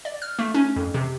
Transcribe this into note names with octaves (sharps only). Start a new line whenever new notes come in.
D5
F6
A3
C#4
F2
C3